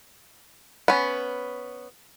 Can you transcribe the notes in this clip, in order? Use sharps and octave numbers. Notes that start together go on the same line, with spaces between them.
B3 C#4